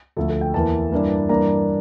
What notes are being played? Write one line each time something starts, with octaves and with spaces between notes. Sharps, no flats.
D2 D3 F3 A3 A4
A4
G5
E2 E3 A#3 A5
G2 E3 A#3 D4
G2 E3 A#3 D4 A#5